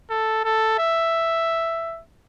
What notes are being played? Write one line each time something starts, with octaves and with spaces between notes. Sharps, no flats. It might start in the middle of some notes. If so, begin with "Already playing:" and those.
A4
A4
E5